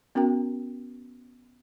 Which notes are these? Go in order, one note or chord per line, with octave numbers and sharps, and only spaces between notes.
B3 C#4 F#4 A#4 G5